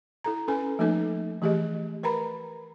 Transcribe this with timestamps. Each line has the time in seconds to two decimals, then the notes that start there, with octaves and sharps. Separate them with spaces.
0.24 E4 A4 A#5
0.48 C#4 A4 B4 G#5
0.79 F3 A3 A#3 D#4 A4
1.42 E3 A3 G4 G#4 D#5
2.03 A#4 B4 A#5 B5